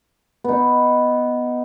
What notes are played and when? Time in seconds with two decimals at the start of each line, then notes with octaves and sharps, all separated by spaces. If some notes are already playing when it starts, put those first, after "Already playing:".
0.44 B3 D#4